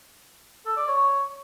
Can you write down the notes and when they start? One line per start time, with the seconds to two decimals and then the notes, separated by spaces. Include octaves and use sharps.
0.66 A4
0.77 D5
0.88 C#5